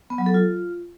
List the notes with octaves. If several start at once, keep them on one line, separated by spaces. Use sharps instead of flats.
B3
F#3
A4
F4